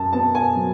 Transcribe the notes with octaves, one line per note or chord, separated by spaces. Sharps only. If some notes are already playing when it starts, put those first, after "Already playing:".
Already playing: F#2 A5
B3 A5
G#5
F#3